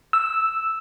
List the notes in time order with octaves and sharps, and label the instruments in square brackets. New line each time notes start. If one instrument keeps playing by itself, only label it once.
[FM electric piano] E6